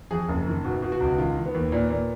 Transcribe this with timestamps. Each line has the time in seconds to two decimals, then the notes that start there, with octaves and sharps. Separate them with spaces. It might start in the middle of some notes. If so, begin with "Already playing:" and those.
0.11 F2 G#4
0.29 F#1
0.47 D#3
0.65 B2
0.82 B2
0.92 F#4
1.00 C#2
1.18 D#3 F4
1.36 D#3
1.46 B3
1.54 D#2
1.72 A#2
1.90 A#2